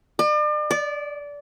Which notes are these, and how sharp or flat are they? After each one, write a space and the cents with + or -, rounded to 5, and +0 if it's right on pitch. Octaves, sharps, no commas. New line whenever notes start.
D5 +40
D5 -20